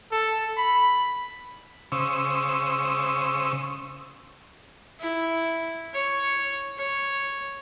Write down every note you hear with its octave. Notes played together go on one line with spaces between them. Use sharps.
A4
B5
C#3 C5 C#6 D#6 E6
E4
C#5
C#5